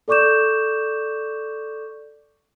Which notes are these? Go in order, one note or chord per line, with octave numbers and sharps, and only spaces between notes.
A4 D5 C#6 D6 G6 E7